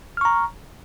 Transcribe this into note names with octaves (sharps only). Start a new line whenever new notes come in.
A#5 C#6 F6